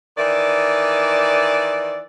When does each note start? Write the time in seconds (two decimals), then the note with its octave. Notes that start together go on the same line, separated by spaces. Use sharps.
0.18 D#3 E3 D5